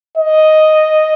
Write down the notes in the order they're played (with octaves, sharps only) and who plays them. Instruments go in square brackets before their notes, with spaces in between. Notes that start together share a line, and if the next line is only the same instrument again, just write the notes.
[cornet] D#5